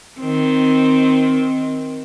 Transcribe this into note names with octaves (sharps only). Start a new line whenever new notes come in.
D#3 C4